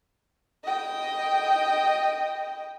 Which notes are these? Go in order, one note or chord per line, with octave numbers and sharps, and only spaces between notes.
D#5 G5